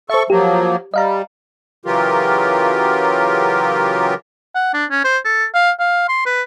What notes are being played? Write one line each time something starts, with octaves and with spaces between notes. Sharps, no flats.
A4 C5 E5 C#6
F3 F#3 A#3 G4
G3 D#5 F5 A#5
C#3 E3 F#3 F4 G4 A#4
F#5
D4
C#4
C5
A4
F5
F5
C6
B4